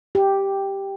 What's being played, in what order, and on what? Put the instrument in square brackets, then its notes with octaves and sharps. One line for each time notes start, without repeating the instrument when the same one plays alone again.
[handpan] G4